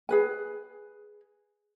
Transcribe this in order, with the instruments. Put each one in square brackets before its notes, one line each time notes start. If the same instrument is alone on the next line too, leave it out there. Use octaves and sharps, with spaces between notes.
[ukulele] G#4 B4 G#5